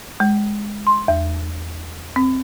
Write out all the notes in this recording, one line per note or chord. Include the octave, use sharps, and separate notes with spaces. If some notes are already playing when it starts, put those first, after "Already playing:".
G#3
C6
E2
C4